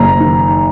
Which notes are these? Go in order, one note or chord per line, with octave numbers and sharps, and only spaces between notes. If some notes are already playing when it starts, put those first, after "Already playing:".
Already playing: F#1 A#5
D#3